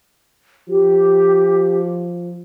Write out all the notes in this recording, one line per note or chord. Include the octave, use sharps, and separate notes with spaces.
F3 G4